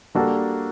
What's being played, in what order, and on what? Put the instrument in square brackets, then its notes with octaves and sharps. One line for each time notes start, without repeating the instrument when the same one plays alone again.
[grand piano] G3 A#3 D4 F#4 A4